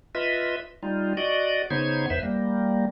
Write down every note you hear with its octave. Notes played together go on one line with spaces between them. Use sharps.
F4 B4 D#5 E5
G3 D#4 F4
F#4 D5 D#5
C#3 B3 D#4 C5 C#5 G#6
E2 B4 C5 E5
G3 A#3